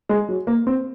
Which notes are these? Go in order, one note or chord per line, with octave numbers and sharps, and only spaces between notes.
G#3
F#3
A#3
C4